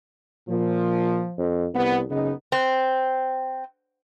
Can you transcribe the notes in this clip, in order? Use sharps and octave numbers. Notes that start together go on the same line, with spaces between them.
A#2 F3
F2
C2 B3
F#1 C#3 B3 D#4
C4